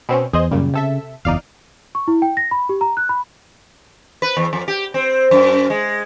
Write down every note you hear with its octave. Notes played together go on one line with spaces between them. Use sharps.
B2 C4 C#4
E2 G#4 C5 D#5
F#2 A#2 C#3 G3
C3 A4 E5
F#1 E2 D#4 D5 F5
C#6
E4
G5
A#6
B5
G4
A#5
F#6
B5
B4
E2
F2
G4
C4
F#2
G#3